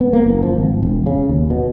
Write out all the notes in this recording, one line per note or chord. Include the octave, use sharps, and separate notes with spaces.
B3
A#3
F#1
F3
G#1
E1
C#3
D#2
B2